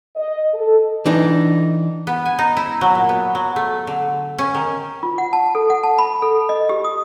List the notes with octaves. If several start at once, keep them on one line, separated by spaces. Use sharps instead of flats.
D#5
A4
E3 D4 D#4
B3
G#5
D#4
E4
F#3
A#2
B3
F#3
A3
D3
C#4
D#3
F4
F#5
A5
A4
F#5
A5
B5
A4
D#5
G4
D#6